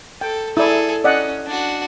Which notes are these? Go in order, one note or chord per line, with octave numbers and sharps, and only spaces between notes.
A4 G5
E4 G#4 A4 D5
C#4 D5 D#5 F#5
D4 F#4